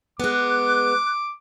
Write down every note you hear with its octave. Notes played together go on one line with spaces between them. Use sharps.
G#3 B3 D6 F#6